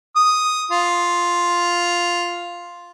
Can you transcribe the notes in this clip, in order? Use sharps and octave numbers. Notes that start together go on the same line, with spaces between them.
D#6
F4